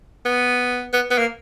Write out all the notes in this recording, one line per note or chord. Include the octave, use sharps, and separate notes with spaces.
B3
B3
B3
A#3